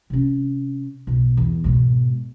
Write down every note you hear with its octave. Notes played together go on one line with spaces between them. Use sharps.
C3 C#4
B1
E2
G#2 B2